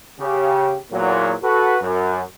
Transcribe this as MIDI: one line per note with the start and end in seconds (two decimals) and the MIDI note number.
0.20 0.77 49
0.20 0.77 67
0.92 1.33 40
0.92 1.33 46
0.92 1.33 54
1.44 1.76 66
1.44 1.76 69
1.44 1.76 71
1.82 2.21 42